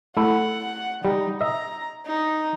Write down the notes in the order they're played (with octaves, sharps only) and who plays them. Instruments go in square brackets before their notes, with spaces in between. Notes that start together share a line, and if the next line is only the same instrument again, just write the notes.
[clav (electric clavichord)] A3 E4 [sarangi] F#5
[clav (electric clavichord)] G3 [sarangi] D#4
[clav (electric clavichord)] D#5 E5 [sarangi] A#5
[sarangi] D#4